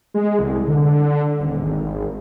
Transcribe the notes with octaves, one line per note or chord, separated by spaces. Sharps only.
G#3
C2
D3
D#1
G#1